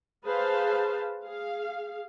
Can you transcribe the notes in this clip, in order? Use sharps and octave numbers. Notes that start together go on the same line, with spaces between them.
G#4 B4 C5 F5 A5
G#4 F5